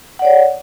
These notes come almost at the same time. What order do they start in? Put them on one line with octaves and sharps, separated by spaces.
F#5 D5 C#5